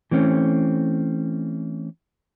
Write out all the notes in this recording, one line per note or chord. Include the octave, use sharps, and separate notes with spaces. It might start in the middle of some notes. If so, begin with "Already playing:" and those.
E3 A3 C4 C#4